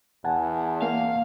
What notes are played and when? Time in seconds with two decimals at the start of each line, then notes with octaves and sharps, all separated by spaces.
0.25 E2 F#5 G#5 A5
0.82 A#3 F5